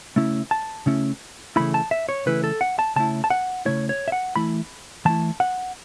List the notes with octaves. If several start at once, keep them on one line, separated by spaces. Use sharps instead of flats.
C#3 A3 C#4 E4
A5
C#3 A3 C#4 E4
C#3 E3 A3 E4 B5
A5
E5
C#5
C#3 E3 A3 E4 B4
A4
F#5
A5
C#3 A3 E4 A5
A5
F#5
C#3 A3 E4 C#5
C#5
E5
F#5
E3 A3 E4 B5
E3 A3 E4 A5
F#5